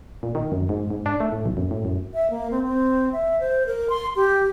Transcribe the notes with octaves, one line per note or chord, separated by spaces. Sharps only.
A#2
D#3
F#2
G#2
G#2
D4
A3
A2
B1
F#2
A2
F#2
E5
A#3
C4
C4
E5
C5
A#4
C6
G4